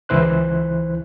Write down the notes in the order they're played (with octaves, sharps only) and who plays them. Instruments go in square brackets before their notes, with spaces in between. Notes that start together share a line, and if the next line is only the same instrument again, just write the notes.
[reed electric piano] C#2 E3 E4 C5 F#6